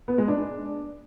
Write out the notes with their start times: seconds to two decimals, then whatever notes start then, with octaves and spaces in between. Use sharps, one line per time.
0.08 B3
0.18 G#3
0.28 D4